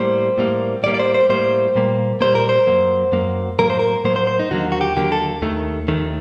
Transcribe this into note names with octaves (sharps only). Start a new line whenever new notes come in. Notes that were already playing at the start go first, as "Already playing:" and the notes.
Already playing: A2 G3 A#3 C5
A2 G3 A#3
A2 G3 A#3 D5
D5
C5
C5
A2 G3 A#3 C5
A#2 G3 A#3
A#2 G3 A#3 C5
A#4
C5
F#2 F#3 A#3
F#2 F#3 A#3
A2 F#3 A#3 A#4
C5
A#4
A2 F#3 A#3 C5
C5
C5
D#4
D#2 D3 F#3 A#3 F#4
F#4
G4
D#2 D3 F#3 A#3 G4
A4
D#2 D#3 A3
D#2 D#3 A3